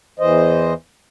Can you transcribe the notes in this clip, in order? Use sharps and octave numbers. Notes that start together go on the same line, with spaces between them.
E2 E3 C5 D#5